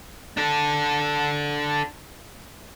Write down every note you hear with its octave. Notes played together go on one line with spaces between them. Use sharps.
D4 A4